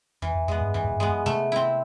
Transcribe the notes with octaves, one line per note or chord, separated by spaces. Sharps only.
F2 E3
F2
F2 G#3 B3
G2
F#2 E3
G#2
G2
G#3 B3
F#2
C3 A3
C4 E4